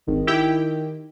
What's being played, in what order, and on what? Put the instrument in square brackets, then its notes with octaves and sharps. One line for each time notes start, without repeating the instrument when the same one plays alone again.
[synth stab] G#1 [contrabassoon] D#3
[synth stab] E4 G4 G5